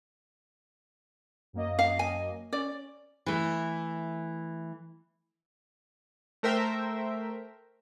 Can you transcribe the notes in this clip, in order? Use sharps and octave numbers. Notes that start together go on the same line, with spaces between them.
F#2 A#3 D#5
F5
G#5
C#4 D5
E3 A3
A3 A#4 C5 E5 G5